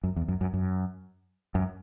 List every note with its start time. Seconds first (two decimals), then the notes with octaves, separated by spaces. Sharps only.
0.04 F#2
0.16 E2
0.28 F#2
0.41 F#2
0.54 F#2
1.55 F#2